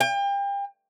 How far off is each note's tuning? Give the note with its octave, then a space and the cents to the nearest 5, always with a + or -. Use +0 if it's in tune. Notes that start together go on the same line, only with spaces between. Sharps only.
G5 +35